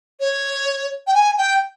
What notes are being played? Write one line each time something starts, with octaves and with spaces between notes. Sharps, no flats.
C#5
G5
G#5
G5